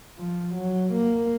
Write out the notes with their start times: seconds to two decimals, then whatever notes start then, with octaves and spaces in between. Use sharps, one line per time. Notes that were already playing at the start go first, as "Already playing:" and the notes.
0.19 F3
0.55 F#3
0.93 A#3